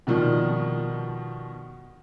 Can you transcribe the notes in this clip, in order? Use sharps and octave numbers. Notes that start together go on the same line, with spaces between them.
B2 D#3 F3 G3 F4